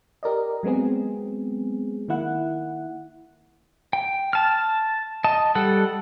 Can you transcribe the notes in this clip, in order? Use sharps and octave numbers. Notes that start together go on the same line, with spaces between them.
G4 A#4 D5 D#5
F#3 G#3 B3 C4 G#4
D#3 A#3 E4 F#5
G5
A5 F6
D#5 A5
G3 A4 F#5